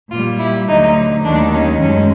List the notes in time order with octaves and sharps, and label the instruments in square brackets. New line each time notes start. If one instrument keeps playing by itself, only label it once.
[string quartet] A#2 G3 F4
E4
D2 D3 F#3 D#4
D#2 D#3 F#3 A3 D4
C#4
F#2 D#3 G#3 C#4